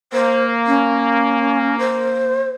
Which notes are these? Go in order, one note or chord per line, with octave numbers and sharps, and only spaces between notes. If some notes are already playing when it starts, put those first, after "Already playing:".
A#3 C5
C#4
C5